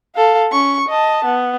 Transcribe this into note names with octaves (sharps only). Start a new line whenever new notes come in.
A4 F5
C#4 C#6
D#5 A5
B3